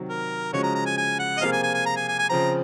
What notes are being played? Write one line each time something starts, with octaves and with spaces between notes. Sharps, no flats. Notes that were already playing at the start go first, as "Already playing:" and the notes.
Already playing: C3 D#3 F#3
A#4
C#3 F3 G#3 C#4 F#4 C#5
A#5
A#5
G#5
G#5
F#5
D#5
C3 F3 A#3 F4 G#4 F5
G#5
G#5
G#5
A#5
G#5
G#5
G#5
C#3 F3 C4 A#5